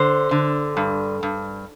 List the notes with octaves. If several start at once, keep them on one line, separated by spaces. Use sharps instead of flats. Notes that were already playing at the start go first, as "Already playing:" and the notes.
Already playing: D3 C5
D3
G2
G2